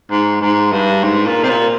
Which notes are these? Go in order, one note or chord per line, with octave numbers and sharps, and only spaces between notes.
G#2
G#2
G2
G#2
A#2
C3
A#2